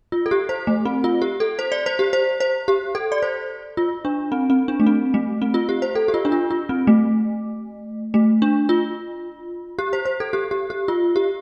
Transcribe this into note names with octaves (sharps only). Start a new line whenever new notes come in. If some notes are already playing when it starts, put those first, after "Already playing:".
F4
A4
G4
C5
A3
C4
F4
G4
A4
C5
D5
C5
G4
C5
C5
G4
A4
D5
C5
F4
D4
C4
C4
D4
A3
C4
A3
C4
F4
G4
C5
A4
G4
F4
D4
F4
F4
C4
A3
A3
D4
F4
G4
C5
C5
A4
G4
G4
G4
F4
G4